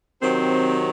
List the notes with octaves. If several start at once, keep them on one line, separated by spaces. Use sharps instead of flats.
C3 D#3 F#3 C4